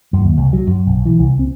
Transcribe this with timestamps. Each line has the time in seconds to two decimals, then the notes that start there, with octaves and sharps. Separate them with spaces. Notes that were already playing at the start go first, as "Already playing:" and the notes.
0.13 F#2
0.24 D#2
0.37 C2
0.53 F#3
0.67 F#2
0.87 B1
1.06 E3
1.19 C2
1.39 C4